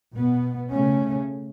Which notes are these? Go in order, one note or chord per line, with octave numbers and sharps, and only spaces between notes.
B2 B3
C#3 A3 C#4